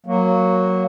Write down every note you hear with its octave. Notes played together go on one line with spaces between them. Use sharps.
F#3 A#3